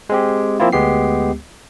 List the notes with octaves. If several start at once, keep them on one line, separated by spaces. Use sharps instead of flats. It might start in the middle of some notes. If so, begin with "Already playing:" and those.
G#3 C4 G4
F3 A#3 C4 E4 F4
D2 G#3 B3 G4 C7